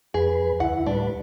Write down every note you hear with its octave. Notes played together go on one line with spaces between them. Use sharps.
F2 G#4 B4
D2 E4 F#5
A2 G3 D4 B4